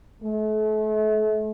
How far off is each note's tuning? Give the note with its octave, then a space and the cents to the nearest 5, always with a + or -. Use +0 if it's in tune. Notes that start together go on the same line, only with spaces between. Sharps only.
A3 -40